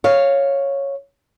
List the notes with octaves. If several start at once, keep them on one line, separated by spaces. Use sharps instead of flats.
C#5 F5